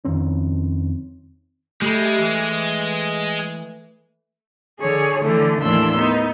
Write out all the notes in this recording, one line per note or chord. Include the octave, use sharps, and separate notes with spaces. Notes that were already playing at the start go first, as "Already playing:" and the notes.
F2 D#3 C4 C#4
G#3 A3 G4 B5
E3
D3 G#4 C#5
D3 E3 A3
D#2 A2 E3 D4 C6 E6
B3 D#4